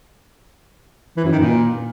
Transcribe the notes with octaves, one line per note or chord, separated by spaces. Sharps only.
E3
F#2
D#3
A#2